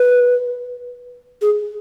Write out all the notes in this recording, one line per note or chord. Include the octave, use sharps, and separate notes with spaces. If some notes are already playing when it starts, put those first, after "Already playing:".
Already playing: B4
G#4